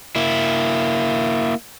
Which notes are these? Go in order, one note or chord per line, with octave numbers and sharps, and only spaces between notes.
A#3 E4